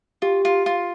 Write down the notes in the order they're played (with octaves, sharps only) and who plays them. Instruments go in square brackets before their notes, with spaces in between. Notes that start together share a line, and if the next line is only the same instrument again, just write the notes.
[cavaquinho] F4 [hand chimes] G4
[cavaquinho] F4
F4